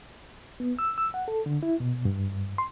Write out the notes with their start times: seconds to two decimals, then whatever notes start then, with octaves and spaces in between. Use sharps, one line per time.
0.60 B3
0.79 E6
0.98 E6
1.14 F#5
1.28 A4
1.46 D3
1.63 E4
1.80 B2
2.05 G2
2.58 C6